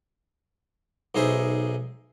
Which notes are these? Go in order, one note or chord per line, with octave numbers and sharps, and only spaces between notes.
B1 D#4 G#4 C5 E5